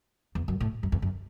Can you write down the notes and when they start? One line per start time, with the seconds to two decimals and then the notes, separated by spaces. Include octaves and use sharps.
0.35 E2
0.48 F#2
0.60 A2
0.83 F#2
0.92 E2
1.02 F#2